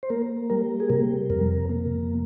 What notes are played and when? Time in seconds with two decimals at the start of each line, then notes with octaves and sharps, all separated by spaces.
0.03 C5
0.10 A#3 A#4
0.50 G3 A#4
0.80 G#4
0.90 C3 A#4
1.30 F2 A#4
1.69 A#3